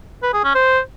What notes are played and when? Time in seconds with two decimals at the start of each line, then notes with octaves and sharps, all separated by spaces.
0.23 B4
0.33 G#4
0.44 C#4
0.54 C5